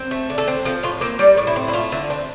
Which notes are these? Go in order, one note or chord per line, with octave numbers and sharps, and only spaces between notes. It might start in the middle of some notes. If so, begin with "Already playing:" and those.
Already playing: C4
A3
D3
A4
C4
F3 A4
A2 F4
A#3 C4
G3 D4
A2
E4
C4
E4
A3 F4
D3 E4
C4 D4